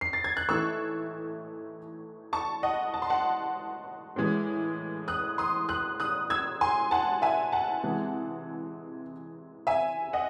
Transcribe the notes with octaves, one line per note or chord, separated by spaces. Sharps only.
C7
A6
G#6
F#6
A2 E3 A3 D#4 C#6 E6
A5 C#6
D#5 F#5
A5
C6
F#5 A5
A2 E3 G#3
D#6 F#6
C6 D#6
D#6 F#6
D#6 F#6
E6 G#6
G#5 C6
F#5 A5
E5 G#5
F#5 A5
C3 E3 G#3 C4
E5 G#5
D#5 F#5